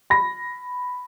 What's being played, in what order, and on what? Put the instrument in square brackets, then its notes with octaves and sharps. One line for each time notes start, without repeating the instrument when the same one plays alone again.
[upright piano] B5 A#6